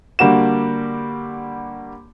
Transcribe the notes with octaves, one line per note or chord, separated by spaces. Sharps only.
D3 G3 A#3 F#4 E7